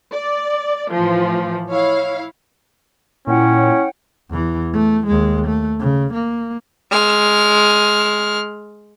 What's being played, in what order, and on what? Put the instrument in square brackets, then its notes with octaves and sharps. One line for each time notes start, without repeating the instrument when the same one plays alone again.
[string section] D5
A2 E3 F3
E4 C#5 F5
[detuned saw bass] A#2 [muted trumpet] C#4 [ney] E4 [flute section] C#5 F#5 G5
[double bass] E2 E3
A3
D#2 G#3
A3
C#3
A#3
[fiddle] G#3 F6